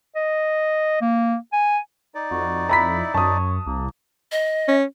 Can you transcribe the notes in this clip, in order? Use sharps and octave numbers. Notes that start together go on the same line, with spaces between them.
D#5
A#3
G#5
D#4 D5
F2 F#4
E4 A#5 B5 B6
F#2 C#5 A5 D#6
C2 A#3
D#5
C#4